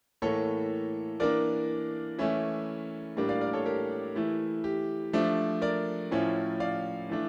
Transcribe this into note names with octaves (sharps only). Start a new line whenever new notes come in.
A2 E3 A#3 A4 C#5
E3 A#3 D4 A#4 D5
E3 A3 C#4 E4
A2 G3 A#3 D4
D5 F5
A#4 D5
A4 C#5
G4 A#4
E3 A3 E4
G4
F3 A3 D4
A#4 D5
A2 F3 C#4 E4
D5 F5
E3 A3 D4